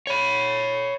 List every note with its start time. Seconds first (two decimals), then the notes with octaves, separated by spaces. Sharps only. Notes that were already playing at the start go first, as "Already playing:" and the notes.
0.07 C#5 B5